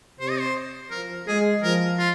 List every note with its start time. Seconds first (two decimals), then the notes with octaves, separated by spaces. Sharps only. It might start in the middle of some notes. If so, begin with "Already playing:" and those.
0.20 C3 C5
0.30 D#5
0.39 C5
0.91 F3 A#4
1.27 G#3 G#4
1.63 F3 A#4
1.98 F4